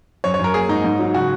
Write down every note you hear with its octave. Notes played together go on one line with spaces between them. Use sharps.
F#2 C#5
C#5
F#2 A#4
A#3 G#4
G#2 D#4
G#2
F#3
C#3 F#4